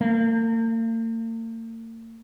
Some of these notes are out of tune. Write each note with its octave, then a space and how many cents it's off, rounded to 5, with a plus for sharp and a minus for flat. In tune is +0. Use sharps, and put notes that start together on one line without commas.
A#3 -45